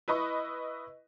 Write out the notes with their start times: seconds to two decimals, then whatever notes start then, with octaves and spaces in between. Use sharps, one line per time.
0.08 E4 B4 D#5 B5 C#6